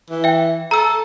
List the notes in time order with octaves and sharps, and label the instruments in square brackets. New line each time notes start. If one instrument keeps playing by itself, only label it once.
[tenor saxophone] E3
[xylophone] E5 G5
[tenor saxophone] A4 [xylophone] A#5 E6